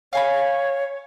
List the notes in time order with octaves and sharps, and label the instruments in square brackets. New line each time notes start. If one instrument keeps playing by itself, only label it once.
[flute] C#5 [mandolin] F5 G#5 B5